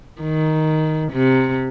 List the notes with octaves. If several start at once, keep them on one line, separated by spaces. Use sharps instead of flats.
D#3
C3